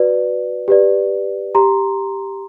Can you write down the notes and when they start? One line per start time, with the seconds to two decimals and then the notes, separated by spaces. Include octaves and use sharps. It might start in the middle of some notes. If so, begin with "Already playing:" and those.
Already playing: F#4 B4 D5
0.68 G4 B4 D5
1.55 G4 A#5 C6